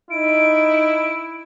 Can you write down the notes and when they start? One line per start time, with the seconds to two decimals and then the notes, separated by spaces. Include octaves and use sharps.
0.11 D#4 E4 D7